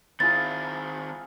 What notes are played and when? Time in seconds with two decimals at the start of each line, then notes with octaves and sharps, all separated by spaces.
0.20 D#3 C4 E4 F4 G#4 A6